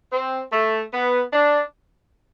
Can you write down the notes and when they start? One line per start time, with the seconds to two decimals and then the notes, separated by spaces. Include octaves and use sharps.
0.12 C4
0.52 A3
0.93 B3
1.33 D4